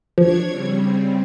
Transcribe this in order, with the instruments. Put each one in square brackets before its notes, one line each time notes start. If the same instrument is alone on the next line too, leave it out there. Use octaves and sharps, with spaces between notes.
[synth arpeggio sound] F3 [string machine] D4 C#5 G#6
[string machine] C#3 G3 C4